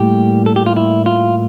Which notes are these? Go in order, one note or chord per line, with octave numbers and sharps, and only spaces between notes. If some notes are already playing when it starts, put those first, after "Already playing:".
Already playing: A2 G3 A#3 G4
A4
G4
F4
E4
F4